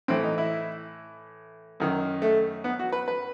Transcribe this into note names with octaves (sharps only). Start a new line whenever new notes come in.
A2 E3 C4
D#4
E4
F#2 D#3
A3
B3
F#4
B4
B4